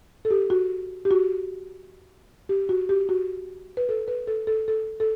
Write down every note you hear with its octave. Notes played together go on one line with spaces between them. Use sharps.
A4
G4
F#4
G4
F#4
G4
F#4
G4
F#4
B4
A4
B4
A4
A4
A4
A4